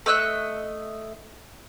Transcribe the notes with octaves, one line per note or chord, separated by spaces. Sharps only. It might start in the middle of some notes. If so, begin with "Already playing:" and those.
A3 D#5 E6 F#6